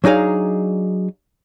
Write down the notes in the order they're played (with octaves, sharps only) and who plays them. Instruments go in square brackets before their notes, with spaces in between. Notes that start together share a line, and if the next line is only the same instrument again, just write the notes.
[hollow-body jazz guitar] F#3 D4 D#4 G#4 F5